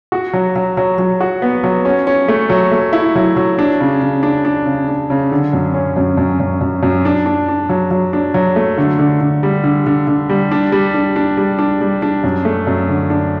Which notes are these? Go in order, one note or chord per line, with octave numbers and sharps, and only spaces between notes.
F#4
F#3
F#3
F#3
F#3
F#4
B3
F#3
C#4
C#4
A3
F#3
A3
E4
F#3
F#3
D4
C#3
C#3
D4
D4
C#3
D4
C#3
D3
F#2
C#4
F#2
F#2
F#2
F#2
F#2
D4
D4
D4
F#3
F#3
D4
F#3
A3
D3
D3
D3
G3
D3
D3
D3
G3
D4
G3
D4
D4
G3
D4
G3
D4
F#2
A3
F#2
D3
D4